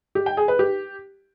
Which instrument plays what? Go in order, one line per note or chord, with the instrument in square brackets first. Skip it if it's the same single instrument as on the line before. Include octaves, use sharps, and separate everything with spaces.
[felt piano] G4
G5
G#4
B4
G4